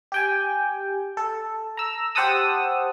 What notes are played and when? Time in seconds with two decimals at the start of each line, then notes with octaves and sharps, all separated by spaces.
0.12 G4 G5 G#5
1.17 A4
1.77 A#5 E6
2.15 G4 C5 F#5 A5 D#6 E6